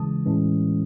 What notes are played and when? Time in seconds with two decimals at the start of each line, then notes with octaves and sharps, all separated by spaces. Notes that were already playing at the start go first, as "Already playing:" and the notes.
Already playing: C#3 E3 G#3 A5 D#6
0.26 A2 E3 G#3 C#4